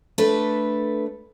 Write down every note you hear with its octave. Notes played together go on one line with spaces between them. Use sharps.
A3 D4 A4 B4